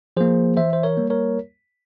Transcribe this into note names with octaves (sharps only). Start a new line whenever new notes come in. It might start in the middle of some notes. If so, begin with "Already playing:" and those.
F3 A#3 G#4 C5
E3 C5 E5
C5
A#4 C#5
G3 A#3
A#4 C#5